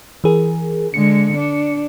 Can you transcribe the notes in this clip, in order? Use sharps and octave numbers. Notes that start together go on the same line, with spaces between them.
E3 G#4 A#4
D3 G#3 C#7
D4